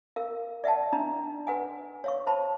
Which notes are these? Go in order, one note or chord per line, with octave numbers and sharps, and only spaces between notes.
A#4 F5
D5 E5 F#5 G5 A5
D4 D#4 A#5
B4 F#5 G#5
C#5 F5 C#6
C5 A5 B5